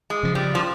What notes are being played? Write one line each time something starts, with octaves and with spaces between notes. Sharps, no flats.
G#3
C#3 F3
G3
F3